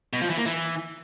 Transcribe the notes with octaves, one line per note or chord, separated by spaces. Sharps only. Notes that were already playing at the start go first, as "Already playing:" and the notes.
B2
F3
E3
A#3
E3